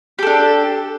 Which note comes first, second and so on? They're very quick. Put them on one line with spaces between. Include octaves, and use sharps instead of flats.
G4 A4 D4